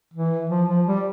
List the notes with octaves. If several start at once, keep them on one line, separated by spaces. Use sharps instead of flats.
E3
F3
F3
G3